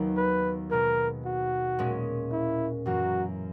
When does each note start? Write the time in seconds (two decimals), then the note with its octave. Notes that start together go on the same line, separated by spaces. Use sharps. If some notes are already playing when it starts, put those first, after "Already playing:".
Already playing: D#2 D#3 F#3 B3
0.17 B4
0.71 B2 G#3 B3 A#4
1.25 F#4
1.79 A#2 G#3 C#4
2.32 E4
2.86 F#2 E3 A#3 F#4